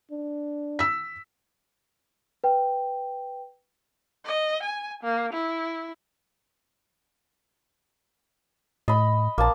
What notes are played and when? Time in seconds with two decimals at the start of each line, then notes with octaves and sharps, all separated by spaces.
0.11 D4
0.79 E6 B6
2.44 B4 G5
4.26 D#5
4.63 G#5
5.04 A#3
5.33 E4
8.88 A2 D#5 B5
9.38 A#1 A#3 A5